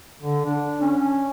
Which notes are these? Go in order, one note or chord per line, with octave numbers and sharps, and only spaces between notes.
D3
D4
C#4